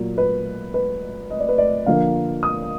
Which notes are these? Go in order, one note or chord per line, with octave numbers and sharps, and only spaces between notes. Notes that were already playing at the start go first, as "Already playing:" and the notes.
Already playing: A#2 F#3 A#3
B4
B4
D#5
D5
B4
D5
D3 F3 A#3 F5
D#6